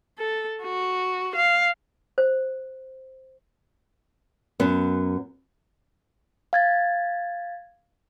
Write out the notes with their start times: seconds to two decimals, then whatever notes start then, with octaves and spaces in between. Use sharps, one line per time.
0.19 A4
0.63 F#4
1.36 F5
2.18 C5
4.60 F#2 B3
6.53 F5 G#6 A6